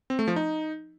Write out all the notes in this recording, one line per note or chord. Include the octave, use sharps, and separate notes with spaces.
C4
A3
F3
D#4